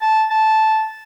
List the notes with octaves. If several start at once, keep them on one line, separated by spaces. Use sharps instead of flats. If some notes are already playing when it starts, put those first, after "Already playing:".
A5
A5